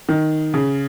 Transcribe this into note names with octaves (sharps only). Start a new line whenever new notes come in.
D#3
C#3